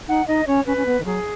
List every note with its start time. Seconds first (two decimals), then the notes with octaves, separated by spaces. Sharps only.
0.08 D#4 F#5
0.28 D#4 D#5
0.47 C#4 C#5
0.66 C#4 B4
0.77 C#4
0.86 B3
1.00 D#3
1.05 F#3 G#4